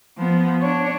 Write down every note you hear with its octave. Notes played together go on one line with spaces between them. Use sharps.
F3 B3
D4 C#5